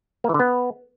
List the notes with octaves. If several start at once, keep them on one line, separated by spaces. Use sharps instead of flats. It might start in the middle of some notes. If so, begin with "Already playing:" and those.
A#3
E3
D3
B3